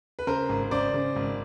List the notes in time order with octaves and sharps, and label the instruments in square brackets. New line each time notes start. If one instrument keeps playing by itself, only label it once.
[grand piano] B4
C#3 A#4 C5
G#1
C#3 C5 D5
C#3
G#1